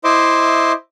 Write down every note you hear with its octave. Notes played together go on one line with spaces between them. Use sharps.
E4 C5 D#5 E5 C6 D6